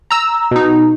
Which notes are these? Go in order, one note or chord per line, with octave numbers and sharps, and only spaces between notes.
A#5 E6
B2 D#4